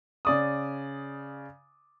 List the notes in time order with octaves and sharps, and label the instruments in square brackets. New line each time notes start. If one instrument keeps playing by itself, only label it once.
[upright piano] C#3 D5 D#6